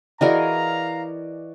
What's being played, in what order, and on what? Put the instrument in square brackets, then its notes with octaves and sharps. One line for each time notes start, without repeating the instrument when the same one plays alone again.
[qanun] E3 G#4 A#4 [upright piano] F#4 D5 D#5 [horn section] F5 A#5